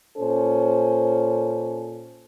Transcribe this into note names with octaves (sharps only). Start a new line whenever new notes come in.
A#2 C#4 A4 C5